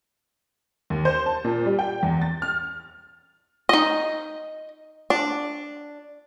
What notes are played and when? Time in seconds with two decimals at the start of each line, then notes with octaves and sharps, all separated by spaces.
0.90 D#2
1.05 C5
1.26 A5
1.44 A#2
1.66 G3
1.79 G5
2.03 E2
2.22 A6
2.42 F6
3.69 D#4 D#5
5.10 D4